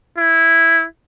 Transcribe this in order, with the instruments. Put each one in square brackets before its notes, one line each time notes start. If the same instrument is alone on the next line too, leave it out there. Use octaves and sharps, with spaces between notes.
[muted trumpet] E4